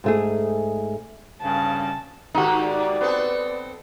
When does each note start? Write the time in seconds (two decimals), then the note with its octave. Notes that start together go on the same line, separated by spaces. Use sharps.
0.04 G#2 A3 G#4
1.42 G2 C#3 A5
2.35 G#2 D#3 D#4 F#4 G4
2.64 D5
3.01 B3 C4 A4